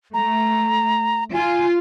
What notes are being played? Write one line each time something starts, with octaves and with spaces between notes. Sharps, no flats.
A3 A#5
F4 G#5